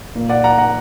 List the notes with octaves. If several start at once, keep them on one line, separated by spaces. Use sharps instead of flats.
A#2 A#3
D5 F#5
F#5 A#5
F#5 A#5